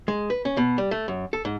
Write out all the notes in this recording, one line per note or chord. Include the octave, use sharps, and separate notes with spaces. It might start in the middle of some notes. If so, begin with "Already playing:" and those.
G#3
B4
C#4
B2
G3
A3
F#2
A4
G#2